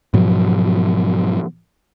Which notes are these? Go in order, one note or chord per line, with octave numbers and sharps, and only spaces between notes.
G#2 B2 F3 F#3